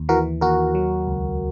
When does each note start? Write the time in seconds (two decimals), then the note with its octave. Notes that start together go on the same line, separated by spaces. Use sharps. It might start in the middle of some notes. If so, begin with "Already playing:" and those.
Already playing: D#2
0.09 E3 F#4 A#4
0.41 D#2 F#4 A#4
0.75 F#3
1.07 C#2